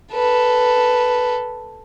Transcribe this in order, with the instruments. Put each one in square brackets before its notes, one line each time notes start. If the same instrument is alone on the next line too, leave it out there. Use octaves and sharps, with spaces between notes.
[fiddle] A4 B4